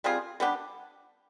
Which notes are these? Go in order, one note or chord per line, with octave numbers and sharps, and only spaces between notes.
G3 C4 F4 G#4
G3 B3 D4 G4